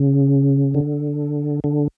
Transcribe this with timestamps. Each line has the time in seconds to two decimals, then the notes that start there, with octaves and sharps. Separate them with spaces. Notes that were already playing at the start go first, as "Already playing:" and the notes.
Already playing: C#3
0.74 D3
1.64 D3